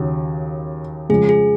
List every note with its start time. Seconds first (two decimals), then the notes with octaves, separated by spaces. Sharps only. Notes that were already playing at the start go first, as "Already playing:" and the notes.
Already playing: D#2 C#3 F#3
1.09 F2 C#3 G#3 G#4
1.29 G#4